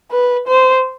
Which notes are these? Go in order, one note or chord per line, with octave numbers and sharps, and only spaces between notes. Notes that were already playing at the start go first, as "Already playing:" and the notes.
B4
C5